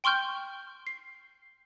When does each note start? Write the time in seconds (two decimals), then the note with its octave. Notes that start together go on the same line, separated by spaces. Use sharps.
0.04 G5 C6 C#6 F6 G6
0.87 C7